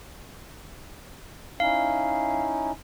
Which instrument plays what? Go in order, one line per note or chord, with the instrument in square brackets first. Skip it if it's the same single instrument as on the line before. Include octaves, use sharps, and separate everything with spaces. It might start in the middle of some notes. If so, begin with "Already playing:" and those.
[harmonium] C#4 D#4 E4 [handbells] F5